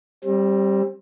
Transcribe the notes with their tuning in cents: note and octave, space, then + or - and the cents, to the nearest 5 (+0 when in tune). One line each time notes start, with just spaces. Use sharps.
G3 +0 C4 +30